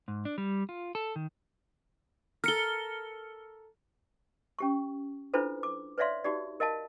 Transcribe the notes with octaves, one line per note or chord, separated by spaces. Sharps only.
G#2
D4
G3
F4
A4
D#3
A4 A#4 F6 C#7 G7
C#4 G4 C#6
D4 E4 F4 A4 B4 C5
D6
B4 C#5 D5 E5 F5 C6
D#4 F#4 G4 D5
A#4 D#5 F5 A5